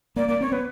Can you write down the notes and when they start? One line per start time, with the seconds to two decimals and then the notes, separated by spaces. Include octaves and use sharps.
0.16 A#3 D5
0.28 A#3 D5
0.41 C4 C#5
0.52 B3 B4